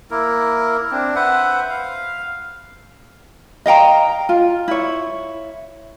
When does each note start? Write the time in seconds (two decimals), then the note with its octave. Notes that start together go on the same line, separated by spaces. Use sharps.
0.11 A#3 E4 A#4
0.91 C4 D4
1.16 B4 C5 E5 F#5
1.70 F5
3.66 D#5 F5 G5 A#5
4.29 F4
4.68 E4 C#5